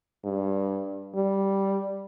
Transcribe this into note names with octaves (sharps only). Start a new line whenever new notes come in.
G2
G3